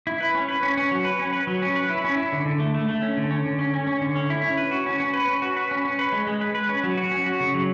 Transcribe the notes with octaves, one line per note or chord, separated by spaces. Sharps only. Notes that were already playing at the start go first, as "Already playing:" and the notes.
E4
B4
C#4
B4
C#4
C#4
F#3
B4
C#4
B4
F#3
C#4
B4
E4
C#4
E4
D3
D3
A3
A3
A3
C#4
D3
C#4
D3
C#4
C#4
C#4
D3
C#4
E4
C#4
B4
F#4
C#4
C#4
B4
C#4
F#4
B4
C#4
C#4
B4
G#3
G#3
B4
B4
C#4
F#3
F#4
C#4
F#4
C#3
F#3